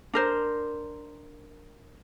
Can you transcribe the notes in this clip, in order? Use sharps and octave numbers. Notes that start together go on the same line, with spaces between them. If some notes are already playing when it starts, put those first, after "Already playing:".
D4 A#4 C5